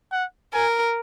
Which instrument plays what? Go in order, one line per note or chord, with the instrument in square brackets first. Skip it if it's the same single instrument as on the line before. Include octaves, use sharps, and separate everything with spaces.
[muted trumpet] F#5
[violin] A#4 [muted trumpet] G#5